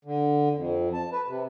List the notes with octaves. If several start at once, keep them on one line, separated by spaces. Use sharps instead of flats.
D3
F2
A5
B4
C3